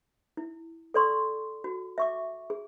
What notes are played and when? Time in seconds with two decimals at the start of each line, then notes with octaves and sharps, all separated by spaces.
0.37 E4
0.94 A4 D5 C6 C#6
1.64 F#4
1.98 E5 C#6 D6
2.50 G#4